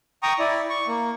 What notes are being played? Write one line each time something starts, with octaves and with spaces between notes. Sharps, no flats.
G5 A#5 C#6 D#6
E4 D5
C#6
A#3